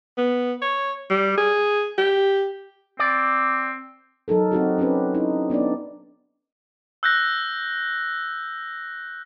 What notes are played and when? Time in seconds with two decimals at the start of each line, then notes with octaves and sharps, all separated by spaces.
0.18 B3
0.62 C#5
1.10 G3
1.37 G#4
1.98 G4
2.99 C4 D5
4.28 F#3 D#4 A4 A#4
4.52 C4 D#4 F#4 G4
4.78 C4 C#4 D#4 G4 B4
5.15 D#4 E4
5.50 B3 D4 D#4 D5
7.03 E6 F#6 G6 A#6